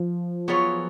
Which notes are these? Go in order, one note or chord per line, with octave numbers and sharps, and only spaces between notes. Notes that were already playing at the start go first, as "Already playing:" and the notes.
Already playing: F3
F#3 B3 F4 G#4 C#5